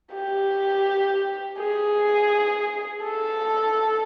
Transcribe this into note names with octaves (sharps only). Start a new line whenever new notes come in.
G4
G#4
A4